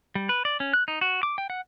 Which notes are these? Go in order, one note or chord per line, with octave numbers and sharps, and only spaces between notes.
G3
B4
D5
C#4
F#6
D#4
F#4
D6
G5
F#5